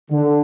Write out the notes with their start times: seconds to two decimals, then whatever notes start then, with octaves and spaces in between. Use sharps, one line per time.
0.11 D3